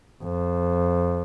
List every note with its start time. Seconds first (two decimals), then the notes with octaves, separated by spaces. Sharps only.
0.23 F2